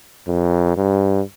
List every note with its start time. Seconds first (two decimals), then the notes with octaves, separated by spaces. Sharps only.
0.27 F2
0.77 G2